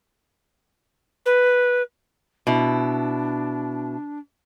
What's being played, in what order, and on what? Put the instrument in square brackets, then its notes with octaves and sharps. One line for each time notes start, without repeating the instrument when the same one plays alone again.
[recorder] B4
[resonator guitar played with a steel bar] B2 E4 [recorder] D4